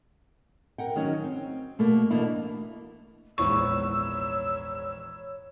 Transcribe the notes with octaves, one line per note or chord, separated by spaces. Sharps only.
A#4 F#5 G5
D#3 F#3 C#4 C#5
C4
B2 A3 A#3
B2 E3 A#3 D4 E4
A#1 E2 G#2 C#5 C#6 E6